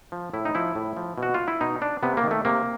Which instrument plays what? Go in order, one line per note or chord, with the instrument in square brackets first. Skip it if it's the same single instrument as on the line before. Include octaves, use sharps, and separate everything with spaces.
[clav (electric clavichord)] F3
A2 E4
D#4
F3 E4
A2
F3
B2
F#4
F4
E4
B2 D#4
D4
C3 B3
A#3
D#3
A3
C3 A#3